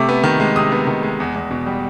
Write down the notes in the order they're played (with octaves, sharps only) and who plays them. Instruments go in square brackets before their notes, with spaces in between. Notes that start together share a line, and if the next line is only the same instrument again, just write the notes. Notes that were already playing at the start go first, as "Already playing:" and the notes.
Already playing: [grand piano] C3 A3 D6
B3
D#3
G#3
C3 D#6
B3
D#3
G#3
E2
E2
B2
G3